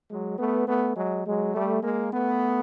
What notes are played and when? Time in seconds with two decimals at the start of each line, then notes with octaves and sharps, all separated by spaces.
0.10 F#3 G#3
0.39 A3 B3
0.68 A3 B3
0.97 F#3 G#3
1.26 F#3 G#3
1.55 G3 A3
1.83 G#3 A#3
2.12 A3 B3